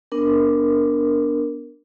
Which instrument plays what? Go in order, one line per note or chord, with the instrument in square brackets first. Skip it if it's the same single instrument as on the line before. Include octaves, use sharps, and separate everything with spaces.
[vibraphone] B3 D4 A#4